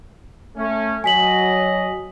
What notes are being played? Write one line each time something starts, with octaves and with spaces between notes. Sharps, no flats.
A3 C#4
F#3 D#5 G#5 B6 F#7